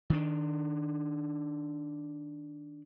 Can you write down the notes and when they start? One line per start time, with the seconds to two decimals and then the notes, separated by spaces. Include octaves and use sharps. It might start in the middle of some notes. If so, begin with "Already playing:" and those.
0.10 D#3 D4